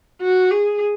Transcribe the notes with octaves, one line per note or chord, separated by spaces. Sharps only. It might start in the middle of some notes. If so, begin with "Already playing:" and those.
F#4
G#4